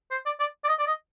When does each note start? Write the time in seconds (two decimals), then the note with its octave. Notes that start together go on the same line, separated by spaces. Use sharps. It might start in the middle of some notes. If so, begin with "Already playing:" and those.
0.12 C5
0.26 D5
0.40 D5
0.64 D5
0.69 D#5
0.79 D5
0.87 D#5